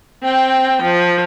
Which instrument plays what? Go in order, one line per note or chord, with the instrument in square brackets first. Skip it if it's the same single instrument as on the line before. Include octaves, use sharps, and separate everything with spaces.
[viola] C4 G5
F3